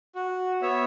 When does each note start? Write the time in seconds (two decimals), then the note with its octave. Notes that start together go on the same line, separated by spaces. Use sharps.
0.16 F#4
0.62 B3 C#5 E5